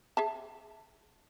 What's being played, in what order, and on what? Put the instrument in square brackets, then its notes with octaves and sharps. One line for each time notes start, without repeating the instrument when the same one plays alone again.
[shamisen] G#4 E5 A5